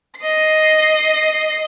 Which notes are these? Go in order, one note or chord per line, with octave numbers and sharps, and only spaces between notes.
D#5 C7